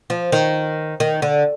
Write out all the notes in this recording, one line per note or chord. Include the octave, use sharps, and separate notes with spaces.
F3
D#3
D#3
D3